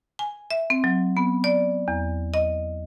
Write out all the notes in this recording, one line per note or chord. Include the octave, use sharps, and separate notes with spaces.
G#5
E5
C4
F#3
B3
D5
E2
D#5